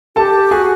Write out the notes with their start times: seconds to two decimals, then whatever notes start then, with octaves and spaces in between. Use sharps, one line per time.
0.16 G4 A4 A5
0.51 F#4 G#4 G#5